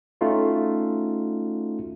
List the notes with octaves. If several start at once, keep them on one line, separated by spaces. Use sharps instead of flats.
A3 C#4 D#4 F4 F#4